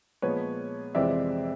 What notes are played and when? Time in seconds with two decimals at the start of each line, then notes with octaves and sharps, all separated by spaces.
0.22 A#2 F3 G#3 B3 B4 C#5
0.95 F2 C3 E3 G#3 C4 D5 E5